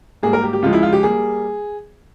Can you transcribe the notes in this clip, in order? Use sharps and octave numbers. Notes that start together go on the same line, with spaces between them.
G#2 G3 A#3 G#4
A#4
G4
G4
C#2 C#3 F3 G#3 F4
E4
F4
G4
G3 A#3 G#4